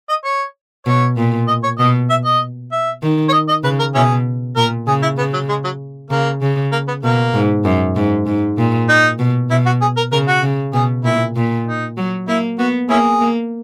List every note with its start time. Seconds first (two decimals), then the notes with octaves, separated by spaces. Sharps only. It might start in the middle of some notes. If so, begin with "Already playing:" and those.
0.09 D#5
0.25 C#5
0.86 B2 C#5
1.17 A#2
1.48 D#5
1.63 C#5
1.79 B2 D#5
2.10 E5
2.25 D#5
2.72 E5
3.03 D#3
3.29 C#5
3.33 D#5
3.49 D#5
3.64 C#3 B4
3.79 A#4
3.95 B2 C#4 E4 G#4
4.57 A#2 A#4
4.87 C#3 G#4
5.03 E4
5.18 C#3 B3
5.34 F#3
5.49 G#3
5.64 F#3
6.10 C#3 A#3
6.42 C#3
6.72 A#3
6.88 B3
7.03 B2 A#3
7.34 G#2
7.65 F#2
7.96 G#2
8.27 G#2
8.58 A#2
8.89 D#4
9.19 B2
9.50 B2 E4
9.66 F#4
9.81 G#4
9.97 A#4
10.12 C#3 A#4
10.28 F#4
10.43 C#3
10.74 B2 G#4
11.04 A#2 E4
11.36 A#2
11.67 D#4
11.98 F#3
12.28 A#3 E4
12.59 B3 F#4
12.89 A#3 C#4 E4 G#4
13.21 A#3